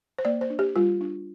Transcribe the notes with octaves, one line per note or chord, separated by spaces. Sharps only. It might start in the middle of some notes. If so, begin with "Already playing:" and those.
C5
A#3 D5
C5
D4
G4
G3 F4
D4